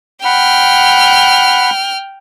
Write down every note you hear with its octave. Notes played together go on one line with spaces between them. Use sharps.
F#5 G5 B5 F6